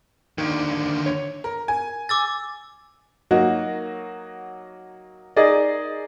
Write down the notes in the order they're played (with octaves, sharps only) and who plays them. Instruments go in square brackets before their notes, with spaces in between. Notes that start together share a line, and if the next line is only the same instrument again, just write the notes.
[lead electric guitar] D#2 D3 [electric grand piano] D#3
[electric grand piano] C#5
[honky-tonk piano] A#4
G#5
[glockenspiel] D6 E6 A6
[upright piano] F#3 A#3 D#4 F#4
D#4 G#4 A#4 D5 D#5